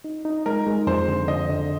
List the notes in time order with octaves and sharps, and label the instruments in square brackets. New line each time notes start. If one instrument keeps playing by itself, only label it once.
[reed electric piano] D#4
D#4
[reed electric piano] G#3 [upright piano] A#4
[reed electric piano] G#3
[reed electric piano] F2 [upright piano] C5
[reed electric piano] D3
[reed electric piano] D3 [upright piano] D#5
[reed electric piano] D3